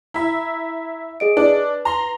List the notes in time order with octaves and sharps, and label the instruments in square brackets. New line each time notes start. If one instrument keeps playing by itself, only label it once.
[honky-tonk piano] E4 E5 [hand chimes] A#5 B5
[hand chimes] G#4 D#5 D7
[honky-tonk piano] D4 [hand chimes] B4
[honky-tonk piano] A#5 C6